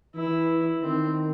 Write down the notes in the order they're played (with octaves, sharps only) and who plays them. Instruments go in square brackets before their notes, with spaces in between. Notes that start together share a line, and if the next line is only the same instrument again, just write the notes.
[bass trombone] E3 [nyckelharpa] E4
[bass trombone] D#3 [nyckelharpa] C4